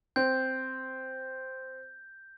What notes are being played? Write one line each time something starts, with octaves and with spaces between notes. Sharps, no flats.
C4 G6